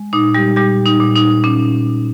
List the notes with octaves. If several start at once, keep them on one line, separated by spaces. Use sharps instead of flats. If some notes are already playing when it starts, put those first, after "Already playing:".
Already playing: G#3
A#2 D#4
G3 G4
A#2 G3 G4
D#4
A#2
D#4
A#2 C#4